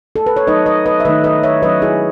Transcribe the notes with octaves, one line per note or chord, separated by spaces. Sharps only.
A4
B4
C#5
F#3 A3 D#4 B4 D#5
B4 D#5
B4 D#5
E5
D#3 A3 D#4 B4 D#5
B4 D#5
C#5 E5
F#3 C#4 B4 D#5
E4 G#4